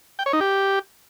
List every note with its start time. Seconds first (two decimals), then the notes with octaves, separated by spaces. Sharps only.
0.19 G5
0.26 C#5
0.33 D#4
0.40 G4